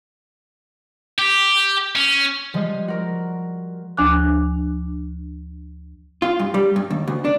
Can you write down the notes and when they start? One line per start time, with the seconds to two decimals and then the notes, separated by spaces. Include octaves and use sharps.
1.19 G4
1.96 C#4
2.54 F3 G3 G#3
2.88 F#4 A#4
3.97 D2 F3 D4 G#5 D6 F#6
6.22 F4
6.39 G2
6.54 G3
6.76 G2
6.90 D#2
7.08 D2
7.25 D4